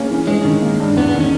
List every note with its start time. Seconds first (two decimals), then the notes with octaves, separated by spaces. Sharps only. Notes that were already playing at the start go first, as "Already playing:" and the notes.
Already playing: A#3 C#4 G#4
0.11 E3
0.27 G#3 C#4
0.45 D#3
0.62 A#3
0.80 G2
0.97 E2 B3
1.08 B3
1.15 D#3
1.20 C#4